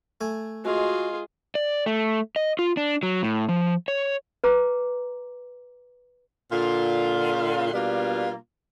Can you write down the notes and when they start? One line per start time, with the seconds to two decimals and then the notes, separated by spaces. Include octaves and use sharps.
0.21 A3 G#5
0.65 G#3 F4 F#4 G#4
1.55 D5
1.86 A3
2.36 D#5
2.59 F4
2.77 D4
3.03 F#3
3.23 A2
3.49 F3
3.88 C#5
4.44 B4 A#5 D6
6.51 A#2 D3 F4
7.73 B2 G3 A#3 D4 F4